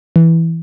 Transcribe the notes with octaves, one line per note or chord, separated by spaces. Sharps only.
E3